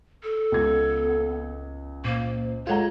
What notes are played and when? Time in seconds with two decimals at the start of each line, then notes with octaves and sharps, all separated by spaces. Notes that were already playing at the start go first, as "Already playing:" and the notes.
0.23 A4
0.52 C#2 B3 G#6
2.05 A#2 A#3 C5
2.67 G#3 F4 A4 C#5 F#5 A#5